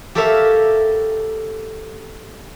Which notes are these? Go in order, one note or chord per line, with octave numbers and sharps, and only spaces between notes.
G4 A4 A#4 C#5 E5 F5